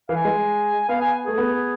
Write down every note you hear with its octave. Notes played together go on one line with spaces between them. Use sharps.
E3 F5
G#5
G#3
B3 F5
G#5
A3 G#4
B3